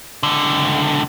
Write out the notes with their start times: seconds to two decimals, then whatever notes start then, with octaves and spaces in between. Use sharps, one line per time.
0.23 C#2 D3